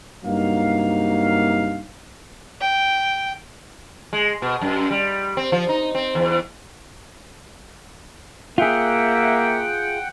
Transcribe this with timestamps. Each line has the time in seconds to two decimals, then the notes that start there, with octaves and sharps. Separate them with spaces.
0.24 G2 C3 F#3 A#3 D#4 F5
2.61 G5
4.13 G#3
4.42 B2
4.61 F#2
4.91 G3
5.37 C4
5.52 F3
5.69 D#4
5.95 C4
6.15 E2
8.58 A#3 F4 G#4 E5 F#5 G5